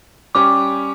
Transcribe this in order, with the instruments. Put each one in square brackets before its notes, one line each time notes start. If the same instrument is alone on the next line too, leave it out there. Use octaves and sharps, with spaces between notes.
[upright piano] G3 C#4 G4 [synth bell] D6